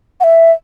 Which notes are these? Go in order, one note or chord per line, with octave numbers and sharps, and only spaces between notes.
F#5
E5